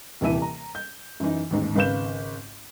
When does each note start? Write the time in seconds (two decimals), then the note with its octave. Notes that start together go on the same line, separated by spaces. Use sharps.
0.21 D#1 C3 E3 E4 E5 D#7
0.42 A#5
0.75 G6
1.20 F#2 E3 D#4
1.50 A1 D#2 G#2
1.75 G#1 C#3 B4 F5 G6 E7